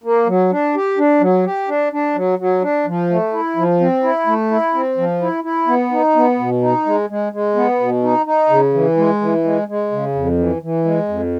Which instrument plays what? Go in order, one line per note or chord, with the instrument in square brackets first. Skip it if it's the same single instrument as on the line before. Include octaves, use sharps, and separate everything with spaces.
[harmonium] A#3
F#3
D4
G4
D4
F#3
G4
D4
D4
F#3
F#3
D4
F3
A3
E4
F3
C4
E4
A3
E4
C4
F3
E4
E4
B3
D#4
B3
B2
D#4
G#3
G#3
G#3
B3
B2
D#4
D#4
C#3
E3
G#3
E3
G#3
G#3
C#3
F2
E3
E3
G#3
F2